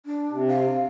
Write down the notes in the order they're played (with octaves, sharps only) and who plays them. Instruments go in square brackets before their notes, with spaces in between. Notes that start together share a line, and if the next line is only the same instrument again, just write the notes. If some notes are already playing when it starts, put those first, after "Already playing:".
[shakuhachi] D4
[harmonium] C3
[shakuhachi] F5